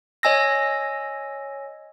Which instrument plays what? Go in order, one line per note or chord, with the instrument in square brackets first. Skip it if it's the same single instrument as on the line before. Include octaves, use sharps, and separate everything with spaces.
[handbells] C#5 D#5 G#5 E6 A#6